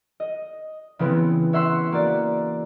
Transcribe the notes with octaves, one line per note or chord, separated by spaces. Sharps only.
D#5
C#3 E3 B3 C4
C#5 E5 F#5 C6 E6 B6
A#3 F#4 D5